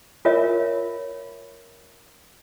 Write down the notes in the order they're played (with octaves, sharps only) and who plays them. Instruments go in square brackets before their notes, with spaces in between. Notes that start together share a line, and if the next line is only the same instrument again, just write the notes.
[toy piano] F4 A#4 C#5 E5